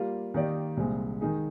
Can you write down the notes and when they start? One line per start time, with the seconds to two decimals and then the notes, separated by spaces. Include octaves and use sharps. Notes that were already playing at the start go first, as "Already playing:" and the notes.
Already playing: G3 A#3 F4
0.34 D#3 A#3 D#4 G4 D5
0.77 C2 A#2 G#3 C4
1.21 D#3 G#3 D#4 G#4